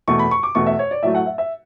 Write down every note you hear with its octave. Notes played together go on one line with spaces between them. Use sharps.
E2 B2 A3 C#6
B5
C#6
D6
E2 B2 A3 C#6
E5
C#5
D5
A2 F#3 A3 E5
F#5
E5
E5